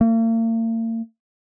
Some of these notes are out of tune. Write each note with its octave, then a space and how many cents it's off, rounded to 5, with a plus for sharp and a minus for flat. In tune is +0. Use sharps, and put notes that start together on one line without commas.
A#3 -45